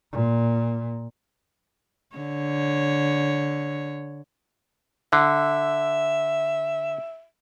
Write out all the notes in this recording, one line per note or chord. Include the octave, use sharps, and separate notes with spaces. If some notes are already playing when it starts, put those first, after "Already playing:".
A#2
D3 C#5
D3 E5